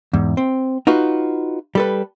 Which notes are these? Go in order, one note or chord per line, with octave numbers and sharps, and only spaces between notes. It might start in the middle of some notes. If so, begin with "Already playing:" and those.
E2 G#2
C4
D#4 F4 F#4 B4
G3 A4 B4